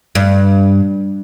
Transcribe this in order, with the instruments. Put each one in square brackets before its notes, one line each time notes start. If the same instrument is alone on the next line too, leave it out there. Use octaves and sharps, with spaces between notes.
[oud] G2